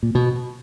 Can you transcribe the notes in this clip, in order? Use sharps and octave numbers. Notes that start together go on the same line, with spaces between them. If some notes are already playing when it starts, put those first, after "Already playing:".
A#2
B2